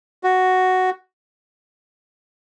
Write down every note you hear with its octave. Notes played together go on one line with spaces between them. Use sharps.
F#4